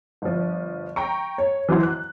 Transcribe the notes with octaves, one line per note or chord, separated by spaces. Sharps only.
G1 F3
G5 A#5 C#6
C#5
E3 F#3 E4 C5
F#6